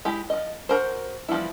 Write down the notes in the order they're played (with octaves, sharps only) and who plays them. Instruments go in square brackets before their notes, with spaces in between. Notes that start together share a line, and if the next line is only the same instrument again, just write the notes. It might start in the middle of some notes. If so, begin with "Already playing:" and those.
[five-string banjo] G#3 E4 G4
F3 D#5
F#4 A#4 C5
E3 F3 G3 B3 E4